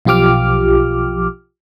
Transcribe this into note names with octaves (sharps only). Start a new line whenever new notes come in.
B1 F3 F4 G4 D6 F6